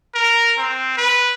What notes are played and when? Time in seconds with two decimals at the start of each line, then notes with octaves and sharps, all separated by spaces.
0.14 A#4
0.58 C4
0.98 B4